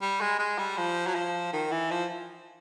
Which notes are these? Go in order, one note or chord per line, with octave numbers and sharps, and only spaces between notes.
G3
G#3
G#3
G3
F3
F#3
F3
D#3
E3
F3